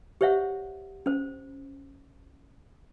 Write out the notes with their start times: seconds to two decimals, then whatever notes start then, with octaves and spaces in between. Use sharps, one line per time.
0.21 G4 C5 C#5 E5 F#5
1.06 C#4 C5